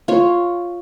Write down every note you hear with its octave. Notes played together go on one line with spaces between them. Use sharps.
F4 C#5